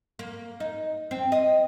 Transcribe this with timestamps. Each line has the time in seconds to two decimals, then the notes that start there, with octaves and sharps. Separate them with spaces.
0.19 A#3
0.60 D#4
1.11 C4
1.32 D#5